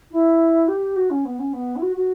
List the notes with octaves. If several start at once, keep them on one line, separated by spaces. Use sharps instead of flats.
E4
G4
F#4
C#4
B3
C#4
B3
E4
F#4
F#4